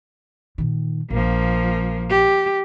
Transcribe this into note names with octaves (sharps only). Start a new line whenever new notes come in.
A#2 D#3
A#1 F3 A#3
G4